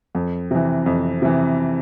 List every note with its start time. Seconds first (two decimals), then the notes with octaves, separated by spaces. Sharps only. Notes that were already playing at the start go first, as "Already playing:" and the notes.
0.15 F2
0.51 C3 E3
0.86 F2
1.22 C3 E3